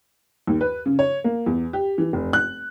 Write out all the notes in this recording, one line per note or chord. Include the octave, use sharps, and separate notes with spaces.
D#2
B4
C#3
C#5
A#3
E2
G4
E3
F1
F#6